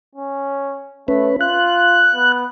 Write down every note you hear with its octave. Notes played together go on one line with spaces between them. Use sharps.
C#4
A3 C#4 B4
F4 F#6
B3